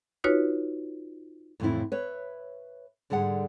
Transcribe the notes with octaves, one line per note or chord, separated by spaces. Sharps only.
D#4 F4 F#4 B4 C#5
F2 A2 C#3 E3 C4 E4
B4 C#5 E5
G#2 D3 G3 G#4 F#5